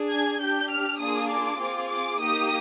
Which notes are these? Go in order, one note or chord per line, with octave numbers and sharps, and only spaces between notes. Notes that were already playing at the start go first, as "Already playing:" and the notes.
Already playing: D4 G#4
G#6
D4 G4 G6
F6
A#3 D4 F4 G#4 D#6
D6
C4 F4 G#4
D6
A#3 D#4 G4 D#6